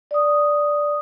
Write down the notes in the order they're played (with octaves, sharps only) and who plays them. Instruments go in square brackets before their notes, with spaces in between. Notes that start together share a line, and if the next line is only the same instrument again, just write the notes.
[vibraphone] D5 D#6